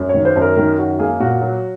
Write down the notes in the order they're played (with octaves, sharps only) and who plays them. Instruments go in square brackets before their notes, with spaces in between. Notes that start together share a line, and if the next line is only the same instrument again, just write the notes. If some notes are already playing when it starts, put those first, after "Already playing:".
Already playing: [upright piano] F#2
C#5
D#3
C5
F#2
A#4
D#3 A#4
F#2 F#4
A#3 G#4
A#2 F#4
F#3